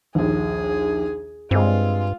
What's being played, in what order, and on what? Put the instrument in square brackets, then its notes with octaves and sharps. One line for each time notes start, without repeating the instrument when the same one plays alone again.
[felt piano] A#1 D#2 [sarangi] G#4
[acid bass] G2 [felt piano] G#3 C4 [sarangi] F4